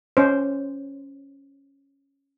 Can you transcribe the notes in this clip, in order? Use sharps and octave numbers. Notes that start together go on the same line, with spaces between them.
C#4 C5